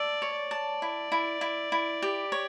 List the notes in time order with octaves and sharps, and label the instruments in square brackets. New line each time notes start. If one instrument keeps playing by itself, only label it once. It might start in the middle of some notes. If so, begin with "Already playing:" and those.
Already playing: [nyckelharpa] D5 [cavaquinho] E5 A5
[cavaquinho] C#5
[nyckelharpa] D5
[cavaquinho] A5
E4
E4
E4
E4
G4
C#5